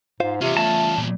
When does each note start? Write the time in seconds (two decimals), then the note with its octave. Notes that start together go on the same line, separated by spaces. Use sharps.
0.20 G#2 F4 C5 F5
0.41 E2 C3 C#4 F4
0.57 A3 A5
0.98 A#2